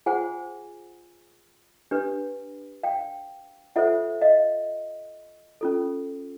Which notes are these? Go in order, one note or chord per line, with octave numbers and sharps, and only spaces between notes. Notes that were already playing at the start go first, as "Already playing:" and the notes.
F4 G#4 C5 F#5 G#5
D4 G4 B4
F5 G5
F4 A4 C5 E5 F#5
D#5 F5
C#4 F4 A4